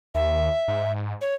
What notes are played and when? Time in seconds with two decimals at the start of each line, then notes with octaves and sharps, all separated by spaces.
0.15 D#2 E5
0.68 G#2
1.21 C#5